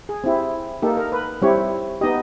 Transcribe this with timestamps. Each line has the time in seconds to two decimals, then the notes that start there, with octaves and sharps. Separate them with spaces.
0.09 G#4
0.24 C4 E4 G4
0.82 A#3 D#4 G4 A4
0.97 A#4
1.12 B4
1.42 G3 C4 E4 G4 C#5
2.01 B3 D#4 G4 D#5